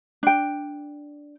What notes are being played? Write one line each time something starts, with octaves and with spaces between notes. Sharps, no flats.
D4 G5